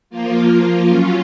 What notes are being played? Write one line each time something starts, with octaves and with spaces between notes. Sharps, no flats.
F3 A#3 F4
F#3 C#4 F4